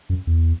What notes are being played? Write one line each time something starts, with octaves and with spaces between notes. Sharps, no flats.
F#2
E2